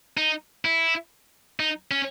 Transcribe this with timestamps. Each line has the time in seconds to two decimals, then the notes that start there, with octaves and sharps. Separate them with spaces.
0.17 D#4
0.65 E4
1.60 D#4
1.91 C#4